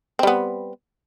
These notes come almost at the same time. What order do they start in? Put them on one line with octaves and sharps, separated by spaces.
C4 G3 B3